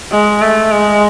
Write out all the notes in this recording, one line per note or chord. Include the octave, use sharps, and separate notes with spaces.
G#3
A3
G#3